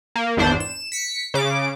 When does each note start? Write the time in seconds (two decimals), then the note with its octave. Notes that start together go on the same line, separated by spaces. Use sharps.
0.16 A#3
0.37 G#1 E2 D4 C5
0.60 E7
0.92 B6 C#7
1.34 C#3 D6